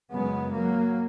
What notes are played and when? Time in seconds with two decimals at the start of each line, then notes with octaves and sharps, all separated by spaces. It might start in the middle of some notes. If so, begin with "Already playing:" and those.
0.13 F#2 C#3 G#3 B3
0.54 F#3 A#3